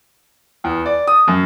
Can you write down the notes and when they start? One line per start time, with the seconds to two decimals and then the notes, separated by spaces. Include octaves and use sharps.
0.64 E2
0.86 D5
1.07 D#6
1.28 F#2